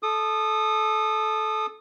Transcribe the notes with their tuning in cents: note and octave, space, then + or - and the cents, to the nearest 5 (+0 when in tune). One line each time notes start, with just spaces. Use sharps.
A4 -15 D#6 -25